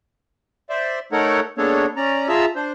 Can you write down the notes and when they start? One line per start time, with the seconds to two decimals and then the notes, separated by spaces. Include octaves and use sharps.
0.69 C5 D5 E5
1.12 A3 D#4 A4 A#4 C#5 F#5
1.58 G#3 A#3 B3 D4 A4 C#5
1.97 C#4 D5 A#5
2.29 F4 G#4 E5 A5 A#5 E6
2.56 D4 C5